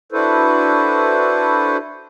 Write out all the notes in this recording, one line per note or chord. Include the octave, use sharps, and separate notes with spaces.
D4 E4 F#4 A4 B4 C5